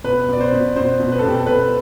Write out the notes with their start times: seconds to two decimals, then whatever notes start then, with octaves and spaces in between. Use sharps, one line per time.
0.04 B2 B4
0.28 B2 D5
0.41 C5
0.52 B2
0.76 B2 C5
1.00 B2
1.12 B4
1.19 A4
1.24 B2 G4
1.34 A4
1.46 B2 B4